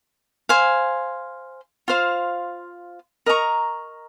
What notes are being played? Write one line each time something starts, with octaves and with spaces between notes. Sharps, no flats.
C5 F5 G#5
F4 C5 F5
A#4 D#5 A#5 C#6